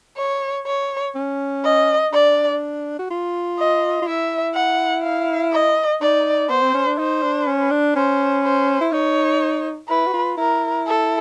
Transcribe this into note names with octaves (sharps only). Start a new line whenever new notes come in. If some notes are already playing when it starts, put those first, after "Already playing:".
C#5
C#5
C#4
D#5
D4 D5
F#4
F4
D#5
F4
E4 E5
F#5
F5
D#5
D#4 D5
B3 C5
C4
C#4
D4
D#4 C5
D4
C#4
D4
C#4 C5
C5
E4
D#4 C#5
E4 B4
F#4
F4
E4 A#4
A4